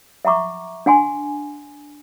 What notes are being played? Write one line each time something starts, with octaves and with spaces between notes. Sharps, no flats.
E5 F#5 A#5 C#6 D6
D4 F#5 G#5 C6